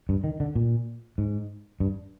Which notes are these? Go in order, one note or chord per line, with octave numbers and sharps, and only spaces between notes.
G2
D#3
D3
A#2
G#2
G2